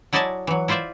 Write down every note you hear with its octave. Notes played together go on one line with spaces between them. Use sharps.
F#3 E4 D5 D#5 G#5 A5
E3 F#3
E4 F4 C5 D5 E5